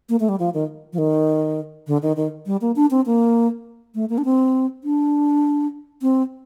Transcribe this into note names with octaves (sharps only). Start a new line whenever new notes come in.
A#3
A3
G3
F3
D#3
F3
D#3
D3
D#3
D#3
G3
A#3
D4
C4
A#3
A3
A#3
D4
C4
D4
C4